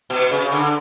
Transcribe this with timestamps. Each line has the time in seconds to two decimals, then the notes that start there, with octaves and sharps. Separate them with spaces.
0.10 B2
0.31 C#3
0.52 D3